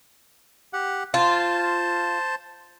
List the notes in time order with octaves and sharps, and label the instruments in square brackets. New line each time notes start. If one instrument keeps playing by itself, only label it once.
[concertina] G4 F#5
[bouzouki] F4 [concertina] C5 A5